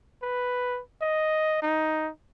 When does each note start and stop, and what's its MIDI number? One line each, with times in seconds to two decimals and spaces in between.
0.23 0.81 71
1.02 1.62 75
1.62 2.10 63